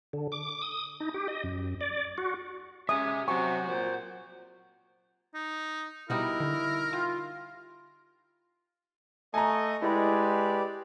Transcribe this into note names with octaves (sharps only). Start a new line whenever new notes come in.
D3
D6
D#6
D#4
G4
D#5
F#2
D5
F#4
G#3 C#4 G4 E5 D#6
C3 F#3 F#4 G#5 C#6
A#2 C5
D#4
B2 G3 D#4 E4 F#4 A#4
D3
F4 G5
A3 D#5 G#5 A#5 C#6 D#6
G#3 E4 G4 B4 D5